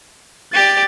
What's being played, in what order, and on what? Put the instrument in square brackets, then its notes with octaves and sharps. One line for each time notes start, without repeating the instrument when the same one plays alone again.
[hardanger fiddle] G4 D5 [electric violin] A6